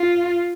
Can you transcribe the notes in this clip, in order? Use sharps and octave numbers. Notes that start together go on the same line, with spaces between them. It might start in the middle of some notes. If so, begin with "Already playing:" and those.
Already playing: F4